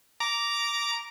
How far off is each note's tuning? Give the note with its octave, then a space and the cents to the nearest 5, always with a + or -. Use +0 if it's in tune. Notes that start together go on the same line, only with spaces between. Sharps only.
A#5 +0 D6 -10